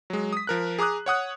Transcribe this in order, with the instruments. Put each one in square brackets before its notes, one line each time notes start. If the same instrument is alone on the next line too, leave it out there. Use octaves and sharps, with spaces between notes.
[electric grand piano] F#3 G#3
D#6 B6
F3 A#4 F#6
G#4 A#5 D6 D#6 F#6
C#5 F#5 D#6 F#6